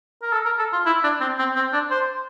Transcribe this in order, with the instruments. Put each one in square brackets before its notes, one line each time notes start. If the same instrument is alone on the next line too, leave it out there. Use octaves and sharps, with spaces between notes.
[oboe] A#4
A4
A#4
A4
F4
E4
D4
C4
C4
C4
D4
C5